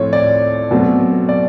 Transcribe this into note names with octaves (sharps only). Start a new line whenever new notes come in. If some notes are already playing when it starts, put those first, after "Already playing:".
Already playing: A2 F3 A3 C4 C#5
D5
B2 F#3 A3 C4
D5